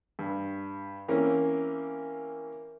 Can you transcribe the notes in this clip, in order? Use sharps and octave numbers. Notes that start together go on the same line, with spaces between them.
G2
E3 A#3 C4 C#4